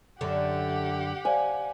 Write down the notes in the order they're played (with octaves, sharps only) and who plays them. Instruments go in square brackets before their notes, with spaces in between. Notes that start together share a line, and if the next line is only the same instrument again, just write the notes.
[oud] F#2 D3 [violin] G4 F#5
[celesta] C5 D5 F5 [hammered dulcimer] G#5